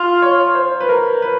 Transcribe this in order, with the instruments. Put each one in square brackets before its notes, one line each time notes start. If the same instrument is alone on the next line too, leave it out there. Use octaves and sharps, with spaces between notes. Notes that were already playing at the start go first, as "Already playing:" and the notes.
Already playing: [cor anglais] F4
[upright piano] C#5
C5
B4
A#4
B4